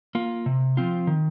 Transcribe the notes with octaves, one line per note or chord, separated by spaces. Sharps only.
A#3 F4
C3
F3 C4 F4
D#3